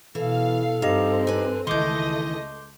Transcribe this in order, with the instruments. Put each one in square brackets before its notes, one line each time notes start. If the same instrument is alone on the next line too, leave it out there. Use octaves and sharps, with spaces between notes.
[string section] B2 F5 [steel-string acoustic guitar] E3 [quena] A4
[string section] G2 C4 [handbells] D#4 G4 D#5 [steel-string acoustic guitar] F5
[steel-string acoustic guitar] B4 G#5
[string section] C#2 A3 D#5 [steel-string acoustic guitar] D#3 E3 [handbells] C6 D6 G6